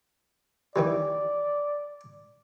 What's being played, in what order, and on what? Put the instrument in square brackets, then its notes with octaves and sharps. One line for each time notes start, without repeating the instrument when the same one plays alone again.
[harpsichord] D#3 E3 G3 [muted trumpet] D5